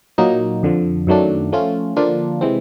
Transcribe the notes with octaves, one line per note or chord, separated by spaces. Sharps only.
A#2 F#3 A#3 D#4
F2 D3 F3
F#2 D#3 F#3 A3 D4
F3 A3 C#4 F4
D3 F3 A#3 D4 F4
C3 E3 G#3 C4